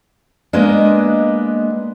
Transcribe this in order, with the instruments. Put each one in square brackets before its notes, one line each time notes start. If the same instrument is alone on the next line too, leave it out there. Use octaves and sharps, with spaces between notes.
[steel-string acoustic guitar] G#3 A#3 B3 D4 D#5